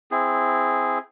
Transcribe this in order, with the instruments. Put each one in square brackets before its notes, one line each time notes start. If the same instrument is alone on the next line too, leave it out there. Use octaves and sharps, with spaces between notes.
[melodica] C4 E4 G#4